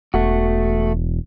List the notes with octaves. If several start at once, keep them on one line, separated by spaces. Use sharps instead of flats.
E1 A3 F#4